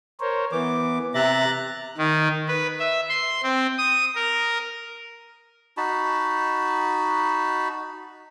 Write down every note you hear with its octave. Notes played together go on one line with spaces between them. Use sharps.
A#4 C5 C#5
E3 B3 D6
C3 E5 A#5 F#6 A6
D#3
B4
E5
C6
C4
D#6
A#4
D#4 F#4 A5 B5